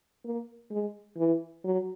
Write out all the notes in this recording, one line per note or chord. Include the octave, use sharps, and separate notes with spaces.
A#3
G#3
E3
F#3